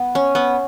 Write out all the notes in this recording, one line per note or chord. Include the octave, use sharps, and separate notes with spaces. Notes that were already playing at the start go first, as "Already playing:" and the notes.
Already playing: B3
C#4
B3